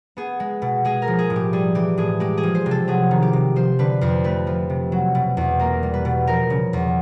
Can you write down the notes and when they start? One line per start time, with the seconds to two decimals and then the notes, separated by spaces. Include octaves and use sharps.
0.17 B3 G#4
0.40 G#3
0.62 B2
0.85 G#3 G#4
1.02 A#4
1.08 F3
1.19 G#4
1.30 A2
1.36 G4
1.53 G3 G#4
1.75 E3 G4
1.97 A2 G#4
2.20 G#3 G4
2.38 G#4
2.43 F3
2.55 C5
2.66 C3
2.71 A4
2.88 F#3 G#4
3.11 D#3
3.22 G4
3.33 C3
3.56 F3 C5
3.79 D3 B4
4.01 F2 C5
4.24 A3 B4
4.47 F3
4.70 C3
4.92 F#3
5.15 B2
5.37 E2
5.59 A#3 A#4
5.83 G3
5.94 B4
6.05 B2
6.27 F3 A#4
6.50 C#3
6.73 E2